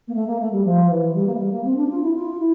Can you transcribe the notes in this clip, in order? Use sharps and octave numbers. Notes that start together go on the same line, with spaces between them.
A#3
A3
A#3
A3
G3
F3
E3
G3
A#3
A3
G3
A#3
C4
D4
F4
E4
F4
E4